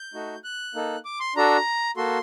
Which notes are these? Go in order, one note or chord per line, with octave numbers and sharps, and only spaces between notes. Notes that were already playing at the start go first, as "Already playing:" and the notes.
Already playing: G6
A3 D#4 F#4
F#6
A#3 D#4 A4
D6
C6
D4 F#4 A4 A#5
A#3 F#4 A4 C6